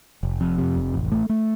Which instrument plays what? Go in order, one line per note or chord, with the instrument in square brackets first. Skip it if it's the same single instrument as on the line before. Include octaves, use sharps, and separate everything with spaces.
[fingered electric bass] F1
F2
C3
F1
A1
A3
A3